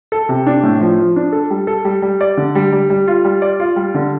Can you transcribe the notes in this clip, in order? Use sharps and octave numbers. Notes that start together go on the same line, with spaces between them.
A4
C3
D4
A2
F3
F3
D4
A4
G3
A4
G3
G3
D5
D3
G3
G3
G3
F4
G3
D5
F4
G3
D3